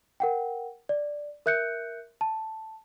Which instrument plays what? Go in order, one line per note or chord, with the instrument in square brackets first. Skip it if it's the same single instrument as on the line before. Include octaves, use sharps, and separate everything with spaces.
[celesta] A#4 F#5 G5
D5
A#4 E5 F#6 G6 C#7
A5